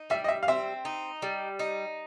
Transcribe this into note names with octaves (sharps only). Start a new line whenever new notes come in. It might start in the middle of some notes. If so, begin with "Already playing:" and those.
Already playing: D#4
G3 E5
D#5
E5
F5
C4 E5
D#4
G3
D#4